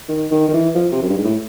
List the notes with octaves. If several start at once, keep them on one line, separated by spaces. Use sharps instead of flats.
D#3
D#3
D#3
E3
F3
C3
F#2
G2
G#2
A2